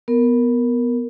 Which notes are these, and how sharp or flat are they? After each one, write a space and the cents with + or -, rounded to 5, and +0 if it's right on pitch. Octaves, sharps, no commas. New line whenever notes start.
B3 +0 A#4 +0